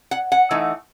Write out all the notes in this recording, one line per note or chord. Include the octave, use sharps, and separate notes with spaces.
F#5
F#5
E3 A3 D#4